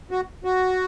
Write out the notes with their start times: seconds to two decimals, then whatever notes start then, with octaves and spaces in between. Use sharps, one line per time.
0.11 F#4
0.44 F#4